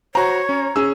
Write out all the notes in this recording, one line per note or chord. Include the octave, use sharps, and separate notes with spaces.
F#4 C5 C#5 A#5
C#4
C#4 G#4 E6